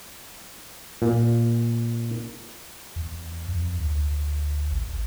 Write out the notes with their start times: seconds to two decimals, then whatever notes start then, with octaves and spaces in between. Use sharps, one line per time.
1.02 A#2
2.96 E2
3.48 F2
3.78 D2
4.72 A1